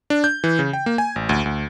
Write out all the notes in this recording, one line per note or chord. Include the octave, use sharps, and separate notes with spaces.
D4
G6
E3
C#3
G5
A#3
G#5
A1
D2
D2